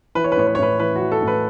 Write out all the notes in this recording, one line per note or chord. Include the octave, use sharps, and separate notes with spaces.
E3 B4
C#5
B4
A2 C#5
B4
C#5
A2 B4
E3 B4
F#4
E3
A4
A2
B4